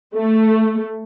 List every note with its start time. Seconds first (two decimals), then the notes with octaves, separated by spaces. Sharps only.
0.15 A3